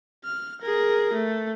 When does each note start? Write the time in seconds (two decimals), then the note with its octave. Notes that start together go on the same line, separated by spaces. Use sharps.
0.24 F6
0.61 G#4 A#4
1.13 A3